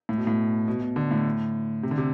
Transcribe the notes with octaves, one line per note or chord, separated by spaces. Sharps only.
A2
B2
A2
B2
B2
D3
A2
C3
D3
C3